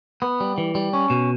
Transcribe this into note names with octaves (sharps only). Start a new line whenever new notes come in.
B3
G3
E3
G3
C#4
B2